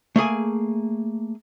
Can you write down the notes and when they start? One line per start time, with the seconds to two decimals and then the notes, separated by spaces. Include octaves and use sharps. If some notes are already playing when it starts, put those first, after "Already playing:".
0.16 A3 A#3 G#4 G#5